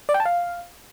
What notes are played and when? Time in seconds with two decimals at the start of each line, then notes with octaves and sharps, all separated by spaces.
0.09 D5
0.14 G5
0.20 A5
0.25 F5